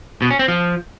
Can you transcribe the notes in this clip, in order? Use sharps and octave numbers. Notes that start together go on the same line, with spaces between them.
B2
C#4
C4
F3